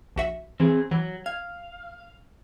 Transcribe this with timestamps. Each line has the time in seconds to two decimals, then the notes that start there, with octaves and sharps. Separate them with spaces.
0.16 A#1 F#4 E5
0.60 E3 C4 G#4
0.91 E3 F#3
1.26 F5 G#6